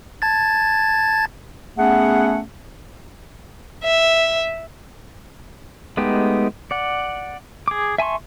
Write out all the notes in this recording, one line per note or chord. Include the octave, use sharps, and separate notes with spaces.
A5 G#6 A6
A3 B3 C#4 G#4 F#5
E5
G#3 A3 B3 D#4 G4
D5 F#5
G#4 D6
E5 G#5 A5 C6 C#6